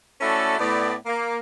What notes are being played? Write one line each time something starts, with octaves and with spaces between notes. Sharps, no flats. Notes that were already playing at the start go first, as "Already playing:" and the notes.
A3 C#4 E4 F#4 A4 D5
A2 B3 D5
A#3